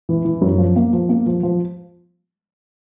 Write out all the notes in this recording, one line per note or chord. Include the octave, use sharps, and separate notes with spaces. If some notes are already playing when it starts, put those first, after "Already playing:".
E3
E3
F#2
F3
A#3
F3
A#3
F3
F3